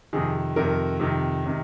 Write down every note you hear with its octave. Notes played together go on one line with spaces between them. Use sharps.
F2 C3 D#3 G#4
F2 C3 D#3 A#4
F2 C3 D#3
C3 D#3